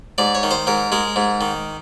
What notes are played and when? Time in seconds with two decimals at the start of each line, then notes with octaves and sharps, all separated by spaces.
0.18 G#2 D5
0.35 C#5
0.43 D#3
0.51 C5
0.67 G#2 A#4
0.92 G#3 A#4
1.16 G#2
1.41 D#3